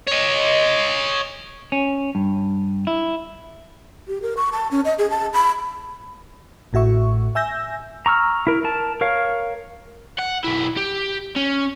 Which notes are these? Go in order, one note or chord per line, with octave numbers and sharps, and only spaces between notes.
C#5 D#5
C#4
G2
E4
G4
A#4
C#6
A5
C#4
D#5
G#4
A5
B5
A1 A2 F#4 E5 C#6
E5 G#5 E6 G6 A#6
A#5 C#6 E6 F6
E4 A#4
A#4 A5
A#4 C#5 F5
F#5
B1 E4
G4
C#4